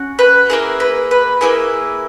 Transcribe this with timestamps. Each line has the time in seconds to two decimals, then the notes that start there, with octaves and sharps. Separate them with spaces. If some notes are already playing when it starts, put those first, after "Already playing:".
Already playing: C#4 F#4
0.19 B4
0.50 A#3 E4 G#4 A#4
0.80 B4
1.11 B4
1.41 A#3 E4 G#4 B4